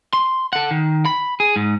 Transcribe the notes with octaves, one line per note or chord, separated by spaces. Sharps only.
C6
A4 F#5
D#3
B5
G#4
G#2